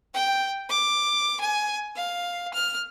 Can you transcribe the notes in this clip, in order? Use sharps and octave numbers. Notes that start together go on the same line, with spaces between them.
G5
D6
G#5
F5
F6